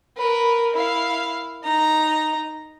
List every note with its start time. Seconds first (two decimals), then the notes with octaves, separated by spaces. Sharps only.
0.17 A#4 B4
0.74 E4 F5
1.63 D#4 A#5